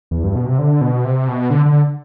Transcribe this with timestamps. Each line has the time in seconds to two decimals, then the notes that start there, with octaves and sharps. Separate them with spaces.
0.11 E2
0.24 G2
0.36 B2
0.46 C3
0.59 D3
0.81 B2
1.05 C3
1.28 B2
1.50 D3
1.66 D3